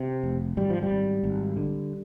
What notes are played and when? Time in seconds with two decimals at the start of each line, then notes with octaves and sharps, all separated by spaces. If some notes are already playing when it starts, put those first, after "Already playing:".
Already playing: C3
0.24 F1
0.57 G#1 G3
0.70 F3
0.83 G3
0.90 G#1
1.24 G#1
1.57 D3